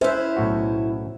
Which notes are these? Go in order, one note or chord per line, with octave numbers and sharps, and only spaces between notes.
C#4 E4 B4 C5 E5
B1 A2 F#4